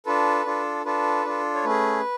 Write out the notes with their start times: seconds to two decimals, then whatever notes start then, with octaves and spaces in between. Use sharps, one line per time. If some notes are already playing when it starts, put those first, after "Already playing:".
0.06 D4 F4 A4 B4
0.45 D4 F4 A4
0.85 D4 F4 A4 B4
1.25 D4 F4 A4
1.54 C#5
1.64 A3 C#4 G#4 B4